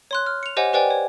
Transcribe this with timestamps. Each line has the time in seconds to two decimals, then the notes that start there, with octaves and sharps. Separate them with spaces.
0.11 C#5 C6 F#6
0.26 F6
0.43 C#7 F7
0.57 G4 C5 C#5 D#5 F#5 G#5
0.73 G4 B4 C5 D5 G5 G#5
0.91 C#5